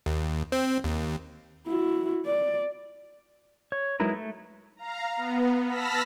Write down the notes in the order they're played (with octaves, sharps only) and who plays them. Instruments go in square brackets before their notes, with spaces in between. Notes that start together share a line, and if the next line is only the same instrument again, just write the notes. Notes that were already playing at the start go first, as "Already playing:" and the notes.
[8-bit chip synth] D#2
C4
D#2
[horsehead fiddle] E4 F#4
D5
[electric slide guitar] C#5
F#3 G#3 D#4 E4 A#4 B4
A3
[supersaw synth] F5 A#5
B3
A5 B5 E6 F6 A#6 B6